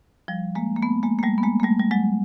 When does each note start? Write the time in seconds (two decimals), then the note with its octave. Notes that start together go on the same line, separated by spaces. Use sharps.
0.28 F3 G3
0.55 G#3 A#3
0.76 A#3
0.82 A3 B3
1.03 G#3 A#3
1.19 A#3
1.23 G3 A3
1.38 B3
1.43 G#3 A#3
1.60 A#3
1.63 G3 A3
1.79 G3
1.91 F#3 G#3